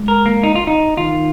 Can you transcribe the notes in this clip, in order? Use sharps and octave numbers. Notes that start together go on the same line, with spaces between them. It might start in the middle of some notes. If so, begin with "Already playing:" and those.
Already playing: G#3
A#4
A#3
D#4
F4
D#4
D#3 F4